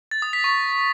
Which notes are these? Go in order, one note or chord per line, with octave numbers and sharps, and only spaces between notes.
A6
D#6
B6
C#6